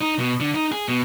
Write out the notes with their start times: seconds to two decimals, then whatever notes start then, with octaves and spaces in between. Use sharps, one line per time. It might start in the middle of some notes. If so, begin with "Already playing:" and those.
0.01 D#4
0.19 B2
0.40 D3
0.55 D#4
0.72 G#4
0.88 B2